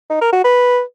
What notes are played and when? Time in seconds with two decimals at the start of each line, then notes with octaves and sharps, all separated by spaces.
0.10 D#4
0.21 A#4
0.33 F#4
0.44 B4